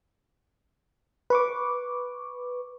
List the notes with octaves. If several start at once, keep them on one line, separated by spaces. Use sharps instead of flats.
B4 C#6 D6